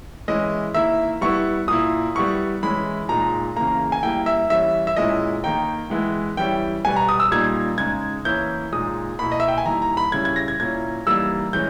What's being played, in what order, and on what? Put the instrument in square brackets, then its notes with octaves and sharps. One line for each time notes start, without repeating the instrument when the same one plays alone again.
[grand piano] E3 G#3 C#4 E4 D#5
D#3 A#3 E4 E5
G3 B3 E4 C#6
A#2 A#3 E4 D#6
G3 B3 E4 C#6
E3 G#3 C#4 E4 B5
A#2 G#3 D#4 A#5
C#3 E3 A#3 A#5
G#5
G3 A#3 E4 G5
E5
E3 G3 C#4 E5
E5
A#2 G#3 C#4 E4 D#5
D#3 A#3 D#4 G5
E3 G#3 B3 E4
E3 G3 C#4 E4 G5
B2 G3 B3 G#5
A#5
D#6
E6
A#2 G3 A#3 D#4 G#6
C#3 G#3 D#4 G#6
E3 A#3 C#4 E4 G6
A#2 G#3 D#4 D#6
B2 A#3 E4 B5
D#5
E5
G5
G#5
D#3 G3 A#3 E4 A#5
A#5
B5
C#3 G3 C#4 E4 G#6
G#6
A#6
G#6
A#2 A#3 C#4 E4 G#6
E3 G3 A#3 D#4 E6
E3 G#3 C#4 G6